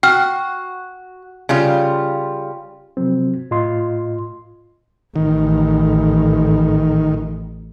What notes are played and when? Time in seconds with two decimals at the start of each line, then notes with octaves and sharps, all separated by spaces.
0.03 F#4 G5 F6
1.49 C#3 G3 F4
2.97 C3 F3 F#3 C4
3.51 A2 F4 D#5 C6
5.16 A1 D#3